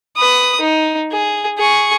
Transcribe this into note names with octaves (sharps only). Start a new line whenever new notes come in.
B4 D#6
D#4
G#4
G#4 C#6